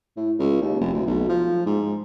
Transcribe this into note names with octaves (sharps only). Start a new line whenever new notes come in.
A2
C#2
D#2
F1
D2
B1
F3
G#2